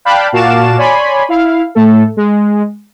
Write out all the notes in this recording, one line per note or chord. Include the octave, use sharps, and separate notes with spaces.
D5 F5 G5 A5 B5 F#6
A#2 F#4 F5 A5 D6 E7
C#5 D5 G#5 B5 C6
E4 F5
A2 A3 A4
G#3